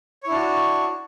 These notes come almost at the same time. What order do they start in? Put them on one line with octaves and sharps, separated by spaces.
C#5 E4 D4 F#4